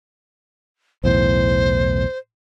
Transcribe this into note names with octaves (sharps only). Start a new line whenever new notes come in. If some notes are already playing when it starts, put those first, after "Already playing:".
B1 E2 A2 C5